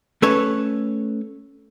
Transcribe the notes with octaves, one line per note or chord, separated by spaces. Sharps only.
A3 C#4 A4 B4 C#5